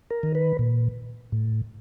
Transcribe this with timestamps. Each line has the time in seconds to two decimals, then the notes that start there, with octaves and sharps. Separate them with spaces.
0.10 A#4
0.23 D#3
0.35 B4
0.59 A#2
1.32 A2